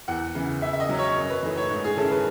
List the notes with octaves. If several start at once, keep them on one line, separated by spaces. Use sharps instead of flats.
E2 F#5
C#3 E3
C#3 E5
E5
D#5
F#3 C#4
C#5
F#2
B4
E3 A3 D#4
C#5
G#2
G#4
D#3 G#3 C#4 E4 A4
B4